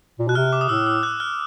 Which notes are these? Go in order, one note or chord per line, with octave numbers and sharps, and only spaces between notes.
A#2
B2 F#6
C3 F6
D6
D#6
A2 E6
E6
F#6
F6